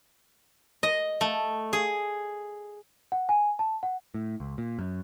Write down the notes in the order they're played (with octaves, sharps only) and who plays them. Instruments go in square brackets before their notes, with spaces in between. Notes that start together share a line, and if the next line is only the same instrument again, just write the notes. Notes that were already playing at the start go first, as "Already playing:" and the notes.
[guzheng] D#5
A3
G#4
[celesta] F#5
G#5
A5
F#5
[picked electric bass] A2
C#2
A#2
F#2